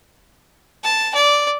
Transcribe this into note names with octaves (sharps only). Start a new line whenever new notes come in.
A5
D5